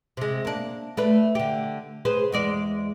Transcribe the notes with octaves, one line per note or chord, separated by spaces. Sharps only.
C3 G#3
A#3 D4
A3 D4 B4
D3 G4
G#4 B4 C5
E2 G#3 D5